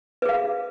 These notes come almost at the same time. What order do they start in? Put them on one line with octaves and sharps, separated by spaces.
B4 G#4 F5